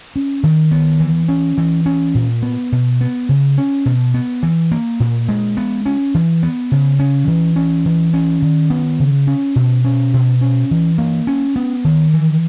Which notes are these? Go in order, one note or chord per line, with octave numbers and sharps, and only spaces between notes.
C#4
D#3
B3
E3
C#4
E3
C#4
A#2
B3
B2
B3
C#3
C#4
B2
B3
E3
A#3
A#2
G#3
B3
C#4
E3
B3
C#3
C#4
E3
C#4
E3
C#4
D#3
B3
C#3
C#4
B2
C#4
B2
C#4
E3
A#3
C#4
B3
D#3
E3